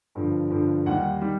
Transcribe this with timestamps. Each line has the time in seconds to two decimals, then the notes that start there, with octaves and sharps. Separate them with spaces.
0.15 G2 D3 F3
0.50 G2 D3 F3
0.86 D#2 D#3 G3 F#5
1.21 D#3 G3